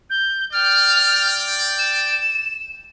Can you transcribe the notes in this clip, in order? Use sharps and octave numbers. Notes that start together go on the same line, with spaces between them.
G6
D5 G5 F6
E7